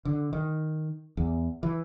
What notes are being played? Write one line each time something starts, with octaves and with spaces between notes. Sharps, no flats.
D3
D#3
E2
E3